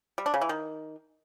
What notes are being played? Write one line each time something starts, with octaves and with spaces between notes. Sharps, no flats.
G3
D4
C#3
E3
D#3